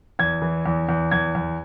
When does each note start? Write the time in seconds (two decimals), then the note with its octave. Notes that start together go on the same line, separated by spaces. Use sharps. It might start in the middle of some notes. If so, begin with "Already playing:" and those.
0.19 E2 G#6
0.42 E3
0.66 E2
0.89 E2
1.11 E2 G#6
1.35 E2